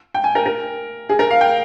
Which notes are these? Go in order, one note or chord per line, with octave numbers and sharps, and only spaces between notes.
G5
G#5
A#4
A#4
G#4
A#4
F5
G5